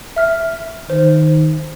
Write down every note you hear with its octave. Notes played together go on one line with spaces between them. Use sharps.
E5 F6 B6
D#3 C5